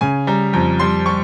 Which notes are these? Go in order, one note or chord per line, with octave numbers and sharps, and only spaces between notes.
C#3 G#5
G3 A#5
F2 A#5
G3 C6
G3 C#6